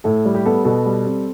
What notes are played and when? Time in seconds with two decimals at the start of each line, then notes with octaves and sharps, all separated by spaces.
0.04 A2 A4
0.25 G3
0.35 G4
0.46 B3 A4
0.65 B2 A4
0.86 G3
1.05 C4